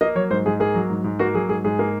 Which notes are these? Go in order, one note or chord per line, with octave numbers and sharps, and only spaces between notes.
A#3 D#5
F#3 C#5
G#2 C5
G#2 G#4
A#3 G#4
F#3
G#2
G#2
A#3 F#4
F#3 G#4
G#2 G#4
G#2 G#4
A#3